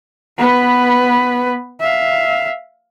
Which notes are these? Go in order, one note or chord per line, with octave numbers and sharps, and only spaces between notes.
B3 B4
E5 F5